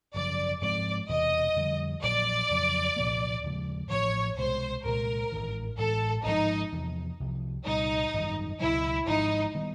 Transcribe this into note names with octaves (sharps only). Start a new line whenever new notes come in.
G#1 F#2 C#3 F3 D5
G#2 F3 G#3 C4 D5
E1 E2 C3 D#5
F2 D3 G3
A#1 A#2 F#3 D5
F2 C#3 F#3
C2 A#2 F3 A#3
D#2 C#3 F3 G#3
A1 A2 F3 C#5
C2 B2 G#3 C5
C2 A#2 F3 G#3 A#4
A1 G#2 D#3
A1 A2 E3 G#3 A4
G#1 G#2 F3 G#3 D#4
E2 C3 F3
C2 C3 F3
C2 A#2 G3 D#4
G#1 F#2 D#3 G3
C#2 B2 F#3 E4
G#1 G#2 F3 D#4
D#3 G3 B3